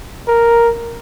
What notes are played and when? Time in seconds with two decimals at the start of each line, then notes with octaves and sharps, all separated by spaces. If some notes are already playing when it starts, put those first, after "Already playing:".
0.28 A#4